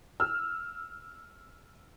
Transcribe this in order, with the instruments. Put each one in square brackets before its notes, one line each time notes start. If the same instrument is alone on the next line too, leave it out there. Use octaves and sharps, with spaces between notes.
[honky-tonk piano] E6 F6